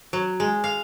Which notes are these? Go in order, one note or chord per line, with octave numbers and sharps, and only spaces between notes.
F#3
G#3
F5